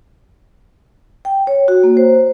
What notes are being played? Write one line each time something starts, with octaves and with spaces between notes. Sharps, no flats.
G5
C#5
F#4
A#3
C5